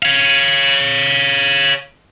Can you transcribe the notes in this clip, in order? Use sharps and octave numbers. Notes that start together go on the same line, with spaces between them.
C#5 F5